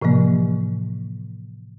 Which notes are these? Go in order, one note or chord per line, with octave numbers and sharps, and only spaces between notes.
A2 C3 E3 F3 A#3